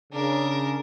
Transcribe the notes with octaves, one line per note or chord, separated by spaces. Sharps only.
C#3 D4 A#4